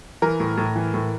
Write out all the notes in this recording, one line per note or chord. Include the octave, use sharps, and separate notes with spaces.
E3 A#4
A2
A2
E3
A2